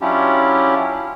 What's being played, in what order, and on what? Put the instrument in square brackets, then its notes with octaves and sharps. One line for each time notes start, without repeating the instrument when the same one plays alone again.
[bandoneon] F#3 C#4 D4 E4 F4 G4